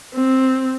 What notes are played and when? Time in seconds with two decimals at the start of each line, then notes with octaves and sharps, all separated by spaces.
0.14 C4